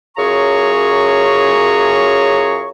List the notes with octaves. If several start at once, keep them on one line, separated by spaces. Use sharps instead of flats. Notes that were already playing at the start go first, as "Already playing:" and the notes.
F#2 F4 G#4 C#5 A#5 C#6